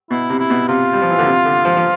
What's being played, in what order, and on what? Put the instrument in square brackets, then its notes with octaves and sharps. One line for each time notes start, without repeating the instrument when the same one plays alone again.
[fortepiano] B2 [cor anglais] E4
[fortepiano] C3
[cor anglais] E4
[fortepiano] B2
[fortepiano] C3 [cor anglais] F4
[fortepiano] G3
F3
E3
D3
C3
D3
F3
F3